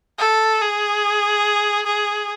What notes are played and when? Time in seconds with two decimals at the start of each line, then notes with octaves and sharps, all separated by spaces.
0.18 A4
0.61 G#4
1.86 G#4